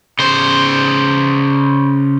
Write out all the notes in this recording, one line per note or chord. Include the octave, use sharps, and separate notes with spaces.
C#3 C5